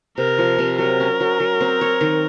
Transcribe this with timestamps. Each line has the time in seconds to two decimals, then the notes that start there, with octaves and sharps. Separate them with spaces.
0.18 C3 A#4
0.38 F3
0.59 C3
0.78 F#3 A#4
1.00 C#4
1.20 F#3
1.40 F#3
1.61 C4
1.81 C#5
2.01 D#3